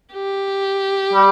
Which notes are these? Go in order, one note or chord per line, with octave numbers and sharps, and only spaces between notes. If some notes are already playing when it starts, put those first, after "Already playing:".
G4
G3